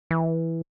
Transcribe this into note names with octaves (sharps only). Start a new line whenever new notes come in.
E3